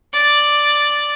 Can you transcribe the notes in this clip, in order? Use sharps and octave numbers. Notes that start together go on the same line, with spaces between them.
D5